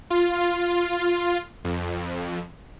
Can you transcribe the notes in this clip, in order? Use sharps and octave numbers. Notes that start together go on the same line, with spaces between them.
F4
F2